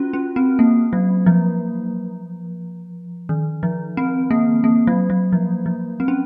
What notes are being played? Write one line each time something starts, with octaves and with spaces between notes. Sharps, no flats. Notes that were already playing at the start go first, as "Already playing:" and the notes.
Already playing: C#4 F4 F#4
C#4
C4
A#3
F#3
F3
D#3
F3
C4
A#3
A#3
F#3
F#3
F3
F3
C4
C#4